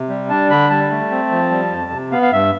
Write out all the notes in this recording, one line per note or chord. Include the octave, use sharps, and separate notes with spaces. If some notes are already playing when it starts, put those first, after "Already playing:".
Already playing: C3
G3
D4 A5
D3 B5
G3 A5
A3
C4
F3
G3
F2
C3
B3 F5
F5
G2 E5